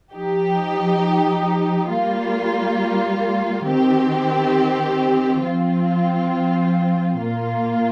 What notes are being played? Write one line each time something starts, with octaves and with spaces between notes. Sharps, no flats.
F3 D#4 G4
G3 A#3 F4
D#3 C4 G4
F3 C4 F4
A#2 A#3 F4